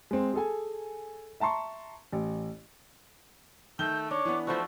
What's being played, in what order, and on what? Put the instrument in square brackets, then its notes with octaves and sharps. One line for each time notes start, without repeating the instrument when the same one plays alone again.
[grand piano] G#3 C4
G#4 A4 G#5
E5 A5 A#5 C6 C#6
A1
[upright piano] D#3 G7 [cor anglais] A3 [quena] G6
[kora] D4 [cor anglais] C#5 [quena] D6
[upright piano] E3 B3
[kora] F3 E4 F#4 [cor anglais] A3 [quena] C5